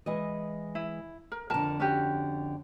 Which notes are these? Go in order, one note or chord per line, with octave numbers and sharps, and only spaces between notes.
E3 G#3 D#5
E4
A#4
F2 D3 A#4 A5
C#4 F#4 G4